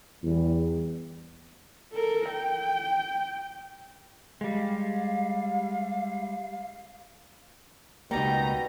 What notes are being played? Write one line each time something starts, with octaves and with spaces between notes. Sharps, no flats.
E2 G3
A4 A#4
G5
G3 G#3 F5
C#2 B2 G3 A#3 D#4 A#5